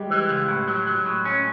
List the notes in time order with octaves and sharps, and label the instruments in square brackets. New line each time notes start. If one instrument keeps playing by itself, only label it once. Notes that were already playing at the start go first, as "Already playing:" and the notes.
Already playing: [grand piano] G3 G#3
[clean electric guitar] E3
C#2
A2
F#3
F#3
A2
C#4